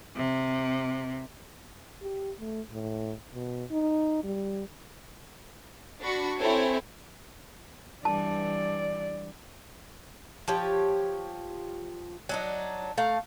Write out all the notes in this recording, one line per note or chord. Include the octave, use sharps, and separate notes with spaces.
C3
G4
A3
A2
B2
D#4
G3
D4 F#4 B5 C#6
C4 E4 A4 C#5 E5 G#5
G2 E3 D5 A5
F3 G4 C#5
F#3 D4 D#4
A3 F5 A#5